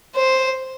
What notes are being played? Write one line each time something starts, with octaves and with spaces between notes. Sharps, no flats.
C5